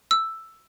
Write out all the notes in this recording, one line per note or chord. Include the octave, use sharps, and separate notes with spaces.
E6